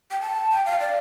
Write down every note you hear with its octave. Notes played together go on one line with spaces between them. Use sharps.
G5
A5
G5
F5
D5